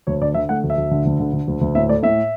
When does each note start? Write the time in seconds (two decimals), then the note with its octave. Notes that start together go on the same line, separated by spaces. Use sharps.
0.07 D2 C#5
0.21 D3 D5
0.34 D3 E5
0.49 A3 F#5
0.64 D2
0.70 E5
0.77 D2
0.91 D3
1.05 D2
1.20 D3
1.33 D3
1.48 D2
1.61 D2
1.75 A2 E5
1.88 A3 D5
2.03 A2 E5